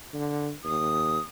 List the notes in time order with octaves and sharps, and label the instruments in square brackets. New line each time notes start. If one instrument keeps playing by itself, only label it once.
[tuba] D3
[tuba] D#2 [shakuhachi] D#6